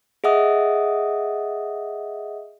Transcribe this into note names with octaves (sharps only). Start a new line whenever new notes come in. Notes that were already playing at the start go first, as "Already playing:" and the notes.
G#4 D#5 E5 F#5 D#6